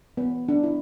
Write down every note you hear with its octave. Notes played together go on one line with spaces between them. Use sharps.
B3
D4
E4